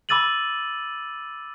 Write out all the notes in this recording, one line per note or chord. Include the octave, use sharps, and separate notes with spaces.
B5 D6 E6 A6 D#7 F#7